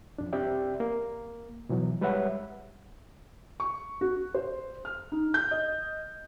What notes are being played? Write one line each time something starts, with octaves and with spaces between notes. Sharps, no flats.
F2 D4
C4 G4 D5 E5 G5
A#3
B2 E3 F#3
G3 G#3 B4 C#5 E5 F#5
C#6
F#4
C5
F6
D#4
G6
D#5